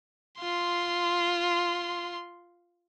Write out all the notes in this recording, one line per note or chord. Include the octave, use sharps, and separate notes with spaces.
F4 C6